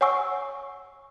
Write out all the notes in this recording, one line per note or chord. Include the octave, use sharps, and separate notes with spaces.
C#5 F#5 G#5 C#6 E6